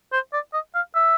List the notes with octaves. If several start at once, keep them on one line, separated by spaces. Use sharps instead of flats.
C5
D5
D#5
F5
E5